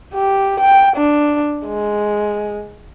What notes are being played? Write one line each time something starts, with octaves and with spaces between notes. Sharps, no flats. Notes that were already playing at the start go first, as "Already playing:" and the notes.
G4
G5
D4
G#3